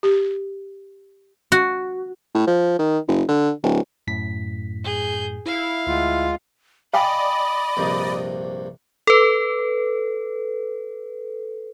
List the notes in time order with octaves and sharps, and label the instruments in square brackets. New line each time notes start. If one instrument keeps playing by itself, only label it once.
[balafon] G4
[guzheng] F#4
[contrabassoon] A2
F3
D#3
F#1
D3
D1
[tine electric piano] F#2 A2 B6
[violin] G#4 G6
[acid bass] E4 [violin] F5
[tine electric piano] D2 F#5 [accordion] G#3 F4
[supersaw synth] D5 D#5 [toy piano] F5 G5 G#5 [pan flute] B5
[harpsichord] A#1 G2 C3
[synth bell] A4 B4